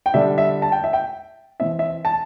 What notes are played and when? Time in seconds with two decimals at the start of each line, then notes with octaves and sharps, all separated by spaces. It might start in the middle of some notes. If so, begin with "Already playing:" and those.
0.06 G5
0.14 D3 G3 D4 E5
0.38 E5
0.62 A5
0.72 G5
0.84 E5
0.93 G5
1.60 E3 C4 E5
1.79 E5
2.05 A5